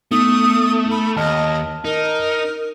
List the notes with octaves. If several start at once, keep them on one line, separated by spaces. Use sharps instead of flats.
A3 B3 D#4 D#6
B5
D#2 D#5 A5 F6
D#4 A#4